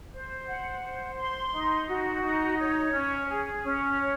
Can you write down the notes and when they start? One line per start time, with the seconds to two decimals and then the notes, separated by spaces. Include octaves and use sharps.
0.11 C5
0.46 F#5
0.81 C5
1.16 C6
1.52 D#4
1.87 F#4
2.22 D#4
2.58 C#5
2.93 C#4
3.28 G#4
3.64 C#4
3.99 C#5